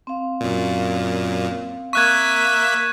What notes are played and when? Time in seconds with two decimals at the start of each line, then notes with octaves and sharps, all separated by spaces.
0.07 C4 F5
0.41 F#2 A#2
1.93 A#3 E5 C#6 F#6 G#6 B6